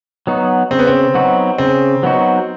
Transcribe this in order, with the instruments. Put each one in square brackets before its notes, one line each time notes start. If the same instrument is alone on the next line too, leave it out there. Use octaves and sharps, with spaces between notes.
[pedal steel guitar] F#3 B3 D#4 F#4
[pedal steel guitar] C#3 [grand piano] C4
[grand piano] B3
C4
[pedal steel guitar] F#3 B3 D#4 F#4
[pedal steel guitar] C#3 [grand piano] C4
[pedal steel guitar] F#3 B3 D#4 F#4